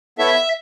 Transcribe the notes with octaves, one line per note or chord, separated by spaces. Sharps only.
B3 E4 A4 C#5 E5